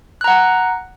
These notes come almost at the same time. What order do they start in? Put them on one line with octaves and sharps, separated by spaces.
F#6 A#5 F#5